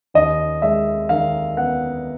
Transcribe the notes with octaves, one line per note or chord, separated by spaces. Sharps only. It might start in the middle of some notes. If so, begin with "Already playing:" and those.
D#2 D#5
G#3 E5
D#3 F5
B3 F#5